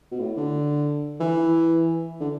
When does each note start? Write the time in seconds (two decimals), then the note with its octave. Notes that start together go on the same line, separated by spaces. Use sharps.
0.11 B2
0.19 A2
0.36 D3
1.20 E3
2.20 D3